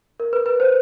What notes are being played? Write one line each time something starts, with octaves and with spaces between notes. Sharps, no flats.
A#4
B4
B4
C5